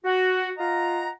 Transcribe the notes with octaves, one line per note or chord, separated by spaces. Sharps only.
F#4
F4 D#5 F5 F#5 A#5